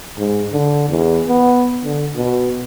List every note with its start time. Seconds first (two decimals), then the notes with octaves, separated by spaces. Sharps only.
0.18 G#2
0.53 D3
0.89 E2
1.28 B3
1.84 D3
2.16 B2